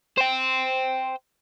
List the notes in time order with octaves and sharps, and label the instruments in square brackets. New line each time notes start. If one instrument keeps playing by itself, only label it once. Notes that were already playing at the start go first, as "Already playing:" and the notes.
[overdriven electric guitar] C5 G5